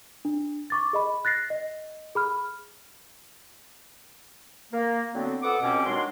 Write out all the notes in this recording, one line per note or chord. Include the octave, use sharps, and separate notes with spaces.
D4
C#6 D6 A6
G#4 D#5 B5
F#6 A6 A#6 C7
D#5
G#4 B5 F6
A#3
D3 F#3 B3 C4
F2 B3 A4 F#5 D6
C#2 G2 B2 C4 C#4 D6
D#3 F#3 G#3 D4 C6